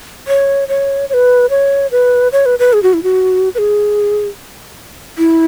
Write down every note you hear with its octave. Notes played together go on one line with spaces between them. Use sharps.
C#5
C#5
C#5
B4
C#5
B4
C#5
B4
B4
G#4
F#4
E4
F#4
B4
G#4
E4